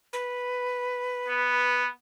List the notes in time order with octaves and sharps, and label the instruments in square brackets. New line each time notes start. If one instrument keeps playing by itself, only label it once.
[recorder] B4
[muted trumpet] B3